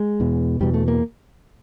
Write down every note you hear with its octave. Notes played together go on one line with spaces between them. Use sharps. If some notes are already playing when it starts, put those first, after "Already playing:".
Already playing: G#3
E2 B2
E2 B2 G3
A3
A#3